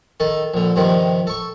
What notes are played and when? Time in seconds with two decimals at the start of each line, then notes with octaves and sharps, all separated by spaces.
0.20 D#3 A4
0.54 A#1 D3
0.76 G2 C3 D#3 F3
1.27 A4 C#6